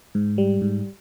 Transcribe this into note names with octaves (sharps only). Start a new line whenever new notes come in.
G#2
G3
G#2